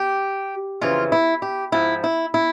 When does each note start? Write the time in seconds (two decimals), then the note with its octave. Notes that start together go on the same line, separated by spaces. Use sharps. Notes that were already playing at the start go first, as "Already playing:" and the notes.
Already playing: G4
0.81 F2 C#3 E3 F4
1.12 E4
1.42 G4
1.72 G#2 F3 E4
2.04 E4
2.34 E4